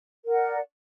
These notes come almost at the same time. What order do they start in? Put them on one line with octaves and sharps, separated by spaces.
A#4 F#5 D5